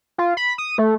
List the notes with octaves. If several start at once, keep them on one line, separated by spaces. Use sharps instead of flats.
F4
B5
D#6
A3